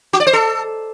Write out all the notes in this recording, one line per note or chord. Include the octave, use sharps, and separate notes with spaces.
F#4
D5
C5
A4